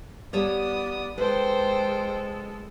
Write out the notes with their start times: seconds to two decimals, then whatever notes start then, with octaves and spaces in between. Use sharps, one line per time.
0.33 G3 B3 C#5 D5 A5 D#6
1.18 G#3 A4 B4 C5 G5